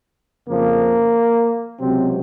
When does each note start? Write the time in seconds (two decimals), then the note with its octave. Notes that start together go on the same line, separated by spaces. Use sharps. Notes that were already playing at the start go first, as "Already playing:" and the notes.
0.48 F2 C#3 F3 A#3
1.79 C#2 C3 F#3 C4